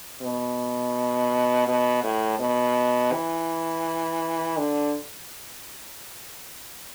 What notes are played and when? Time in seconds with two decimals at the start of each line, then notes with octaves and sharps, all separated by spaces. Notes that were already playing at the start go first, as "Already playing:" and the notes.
0.22 B2
1.67 B2
2.04 A2
2.39 B2
3.12 E3
4.57 D3